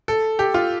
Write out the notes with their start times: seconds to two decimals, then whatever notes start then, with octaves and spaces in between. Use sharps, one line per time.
0.08 A4
0.39 G4
0.54 F4